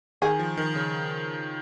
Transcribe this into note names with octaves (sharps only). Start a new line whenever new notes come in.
D#3 G#4
F3
D#3
C#3